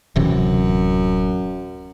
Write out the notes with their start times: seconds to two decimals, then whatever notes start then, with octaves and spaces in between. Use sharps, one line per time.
0.16 D1 F#2 C3 E3